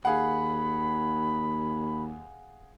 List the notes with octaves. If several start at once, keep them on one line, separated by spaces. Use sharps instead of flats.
D#2 G#4 F5 F#5 B5